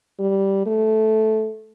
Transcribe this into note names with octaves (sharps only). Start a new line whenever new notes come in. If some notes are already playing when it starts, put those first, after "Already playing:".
G3
A3